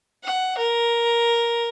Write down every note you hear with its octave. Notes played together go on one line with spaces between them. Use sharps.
F#5
A#4